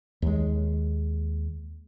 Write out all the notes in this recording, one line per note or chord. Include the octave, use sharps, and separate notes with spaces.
D#2 G#3